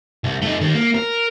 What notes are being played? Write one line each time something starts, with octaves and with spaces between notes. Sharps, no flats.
C2
A3 D#4
D#3 A#3
A#3
A#4